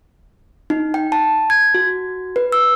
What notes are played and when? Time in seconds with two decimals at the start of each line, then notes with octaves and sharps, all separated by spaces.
0.70 D#4
0.94 G5
1.12 A5
1.50 G#6
1.74 F#4
2.36 B4
2.52 E6